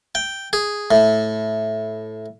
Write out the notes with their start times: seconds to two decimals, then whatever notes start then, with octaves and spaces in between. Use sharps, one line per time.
0.15 G5
0.53 G#4
0.91 A2